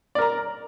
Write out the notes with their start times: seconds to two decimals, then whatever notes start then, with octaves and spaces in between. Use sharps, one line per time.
0.15 D5
0.18 A#4
0.22 A#5